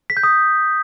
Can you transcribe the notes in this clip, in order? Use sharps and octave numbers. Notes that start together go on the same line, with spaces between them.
B6
G6
D#6